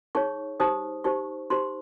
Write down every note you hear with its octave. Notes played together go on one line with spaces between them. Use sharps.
D#4 G#4 C#5 C#6
D#4 G4 C5 D#6
D#4 G4 C5 C#6
D#4 G4 C5 C6